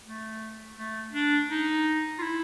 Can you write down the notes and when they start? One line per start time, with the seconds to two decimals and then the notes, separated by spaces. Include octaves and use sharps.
0.04 A3
0.76 A3
1.13 D4
1.50 D#4
2.19 F4
2.23 E4